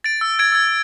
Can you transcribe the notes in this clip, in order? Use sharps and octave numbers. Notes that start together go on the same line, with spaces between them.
A6 D7
E6
G#6 D7
E6 G#6